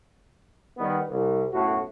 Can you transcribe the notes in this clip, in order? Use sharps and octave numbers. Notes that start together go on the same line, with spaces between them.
D#3 G3 B3
C2
B1 F#2 A2 F#4